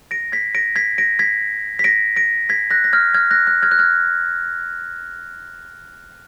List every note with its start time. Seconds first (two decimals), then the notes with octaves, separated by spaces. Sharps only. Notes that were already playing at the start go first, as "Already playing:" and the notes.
0.11 A#6 D7
0.32 G#6 B6
0.55 A#6 D7
0.76 G#6 B6
0.98 A#6 D7
1.19 G#6 B6
1.79 B6
1.84 A#6 D7
2.16 A#6 D7
2.49 G#6 B6
2.70 F#6 A#6
2.84 A#6
2.93 F6 G#6
3.14 F6 G#6
3.31 F#6 A#6
3.47 F#6
3.62 F6 G#6
3.72 F#6
3.79 F6 G#6